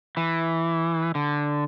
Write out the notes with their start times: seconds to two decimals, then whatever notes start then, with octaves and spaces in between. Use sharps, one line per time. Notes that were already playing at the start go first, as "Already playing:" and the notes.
0.17 E3
1.15 D3